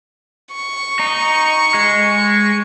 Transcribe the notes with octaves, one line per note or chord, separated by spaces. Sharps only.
C#6
D#4
G#3